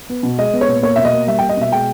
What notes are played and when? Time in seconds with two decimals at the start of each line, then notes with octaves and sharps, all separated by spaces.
0.09 B3
0.23 B2
0.38 G#3 D#5
0.53 B3
0.61 C#5
0.68 A#2
0.82 A#3 C#5
0.96 B2 E5
1.05 D#5
1.13 A#3
1.27 G3 E5
1.38 G5
1.42 A#3
1.49 D#5
1.57 B2 E5
1.71 G#3 G5